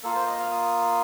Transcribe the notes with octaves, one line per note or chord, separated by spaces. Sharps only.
A#3 F4 A4
C5
D#5
F5
D#6